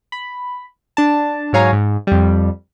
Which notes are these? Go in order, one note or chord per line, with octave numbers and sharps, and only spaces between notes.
B5
D4 A5
G#2 F#3 C#5 F5 G#5 A#5
G#2
F2 G3